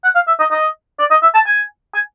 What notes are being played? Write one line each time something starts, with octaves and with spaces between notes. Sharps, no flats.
F#5
F5
E5
D#5
D#5
D5
D#5
E5
A5
G#5
G#5